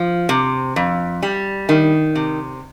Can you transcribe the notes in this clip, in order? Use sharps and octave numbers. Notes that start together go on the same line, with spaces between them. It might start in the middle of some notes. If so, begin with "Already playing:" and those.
Already playing: F3
C3
F2
G3
D#3
C3